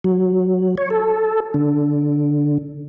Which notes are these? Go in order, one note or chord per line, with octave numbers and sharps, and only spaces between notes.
F#3
C#5
A4
D3